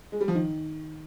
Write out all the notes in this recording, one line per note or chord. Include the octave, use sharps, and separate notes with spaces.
G#3
G3
F3
D#3